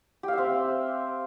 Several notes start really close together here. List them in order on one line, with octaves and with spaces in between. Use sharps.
G4 F5 E5 C4